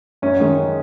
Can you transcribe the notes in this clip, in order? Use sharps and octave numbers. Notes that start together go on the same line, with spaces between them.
F#2 C#4
D#3 G#3